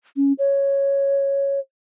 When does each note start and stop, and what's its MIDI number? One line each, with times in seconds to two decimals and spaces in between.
0.16 0.33 61
0.39 1.59 73